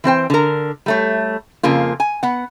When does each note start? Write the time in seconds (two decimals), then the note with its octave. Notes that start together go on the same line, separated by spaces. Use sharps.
0.04 E3 C4 C5 G5
0.30 D3 A#4
0.86 G3 A3 C#5
1.63 F2 C#3 A#3 F4
2.00 G#5
2.23 B3 F#5